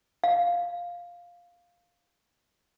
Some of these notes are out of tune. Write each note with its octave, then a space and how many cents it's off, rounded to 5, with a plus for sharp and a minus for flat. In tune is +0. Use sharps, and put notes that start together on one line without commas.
F5 +5